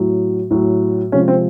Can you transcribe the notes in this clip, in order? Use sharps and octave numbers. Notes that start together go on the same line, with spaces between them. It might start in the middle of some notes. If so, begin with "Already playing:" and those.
Already playing: A2 F#3
A2 F#3
C3 F3 G#3 C#4
C4